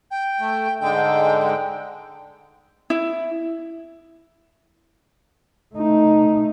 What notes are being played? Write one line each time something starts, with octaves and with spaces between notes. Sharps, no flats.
G5
A3
G#2 D3 G#3 G5
E4
A3 D#4